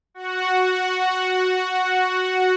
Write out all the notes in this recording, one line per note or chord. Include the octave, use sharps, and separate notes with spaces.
F#4 F#5